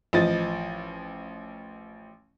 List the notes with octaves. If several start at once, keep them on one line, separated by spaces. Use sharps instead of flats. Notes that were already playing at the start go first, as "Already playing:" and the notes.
A1 F3 D#5 A6